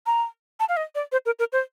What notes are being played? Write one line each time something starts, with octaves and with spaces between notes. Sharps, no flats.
A#5
A5
F5
D#5
D5
C5
A#4
A#4
C5